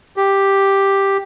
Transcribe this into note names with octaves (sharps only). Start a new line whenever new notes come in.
G4